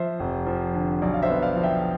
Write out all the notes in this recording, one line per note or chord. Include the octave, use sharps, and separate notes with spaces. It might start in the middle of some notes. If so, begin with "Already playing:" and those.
Already playing: F3 C5 E5
F1
F3
D3
B1 D5
F5
C5 E5
B3
D5 F5
F3
E5 G5